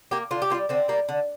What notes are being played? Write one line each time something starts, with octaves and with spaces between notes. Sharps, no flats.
A#3 G4
D3 F4
G4
A#3 F4
G3
D3 C4
G3 A#3
D3